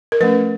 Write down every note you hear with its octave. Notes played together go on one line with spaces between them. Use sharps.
A#4
F3 A3 C#4 B4